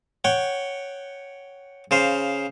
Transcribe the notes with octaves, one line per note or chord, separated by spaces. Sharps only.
C#5 F#5 G5
C#3 C5 F5